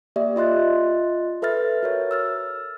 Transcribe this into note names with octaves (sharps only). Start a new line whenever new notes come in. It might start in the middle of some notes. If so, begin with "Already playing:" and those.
A#3 G4 D5 E5
F4 D#5 C6 F#6 A6
A4 B4 E5 F6 A6
F#4 A#4 C#5
E6 F6 A6